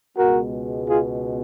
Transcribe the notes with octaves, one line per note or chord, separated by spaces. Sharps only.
C#2 B2 G#3 B3 F#4 A#4
F4 G#4